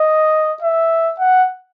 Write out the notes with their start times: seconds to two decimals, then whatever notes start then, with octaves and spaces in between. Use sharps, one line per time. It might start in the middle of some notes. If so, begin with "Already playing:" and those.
Already playing: D#5
0.63 E5
1.19 F#5